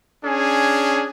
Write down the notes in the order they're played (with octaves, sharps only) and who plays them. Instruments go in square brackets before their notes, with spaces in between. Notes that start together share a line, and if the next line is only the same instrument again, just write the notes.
[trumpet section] C#4 D4 G#4